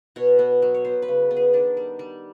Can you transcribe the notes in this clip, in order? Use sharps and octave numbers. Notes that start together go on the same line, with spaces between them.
B2 C#5
B3
F#3
C#5
B3 C5
B4
C#3
B3
G#4
D#3 D4
G3
G3